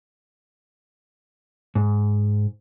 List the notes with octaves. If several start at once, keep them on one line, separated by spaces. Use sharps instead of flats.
G#2